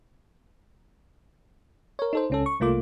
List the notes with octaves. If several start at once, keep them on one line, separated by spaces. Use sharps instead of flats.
A#4 C#5
D#4 A4 C5
C#2 C#4 A4
C#6
C2 A3 A#3 F4 D6